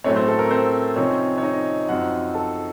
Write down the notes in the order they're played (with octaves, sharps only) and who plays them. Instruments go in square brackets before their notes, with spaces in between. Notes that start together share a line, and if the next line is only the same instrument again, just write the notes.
[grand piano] A2 F#3 A3 C4 C#4 C#5
C4 C5
A4
A#4
C4 C5
C3 F3 C4 C#4 D#4 C#5
C#5
D#4 D#5
F#2 F3 C4 D#4 F#4 F#5
A4 A5